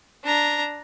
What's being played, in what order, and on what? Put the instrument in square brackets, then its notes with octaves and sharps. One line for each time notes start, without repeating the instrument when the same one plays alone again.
[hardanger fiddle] D4 A#5